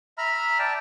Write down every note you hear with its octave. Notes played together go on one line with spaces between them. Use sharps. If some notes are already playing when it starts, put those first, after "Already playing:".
E5 A#5 B5 F6
D5 G5 A5